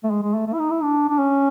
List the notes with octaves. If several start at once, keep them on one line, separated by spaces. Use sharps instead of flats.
A3
G#3
G#3
A3
A3
E4
D#4
E4
D4
D4
C#4